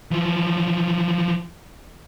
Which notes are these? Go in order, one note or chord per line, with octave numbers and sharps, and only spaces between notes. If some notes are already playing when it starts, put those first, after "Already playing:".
E3 F3